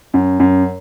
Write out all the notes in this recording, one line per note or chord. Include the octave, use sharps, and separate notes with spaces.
F#2
F#2